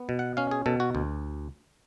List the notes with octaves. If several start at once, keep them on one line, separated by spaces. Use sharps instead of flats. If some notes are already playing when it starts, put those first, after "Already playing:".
Already playing: B3
B2
F#5
C#4 F5
G#4
B2 A4
F#4
D2